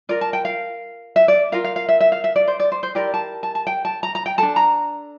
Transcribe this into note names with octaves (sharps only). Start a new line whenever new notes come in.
F4 A#4 D5
A5
G5
F5
E5
D5
F4 A#4 F5
F5
F5
E5
E5
F5
E5
D5
C5
D5
C5
C5
E4 G4 A#4 D5
A5
A5
A5
G5
A5
A#5
A#5
G5
D4 A4 A5
A#5